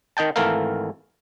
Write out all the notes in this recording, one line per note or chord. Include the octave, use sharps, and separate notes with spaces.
D#3 D#5 G5 A5
G#1 E3 A3 A4 A#4 F5